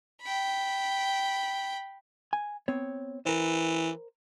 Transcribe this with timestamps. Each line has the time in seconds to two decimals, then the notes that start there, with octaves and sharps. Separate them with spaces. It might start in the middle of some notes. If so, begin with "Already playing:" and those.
0.22 G5 B5
2.33 G#5
2.68 B3 C4 C#5
3.26 E3 A#4 C5